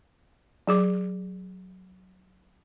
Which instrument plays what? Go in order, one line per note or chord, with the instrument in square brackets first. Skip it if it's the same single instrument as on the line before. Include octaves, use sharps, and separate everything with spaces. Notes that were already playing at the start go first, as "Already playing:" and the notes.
[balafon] F#3 G#4 D6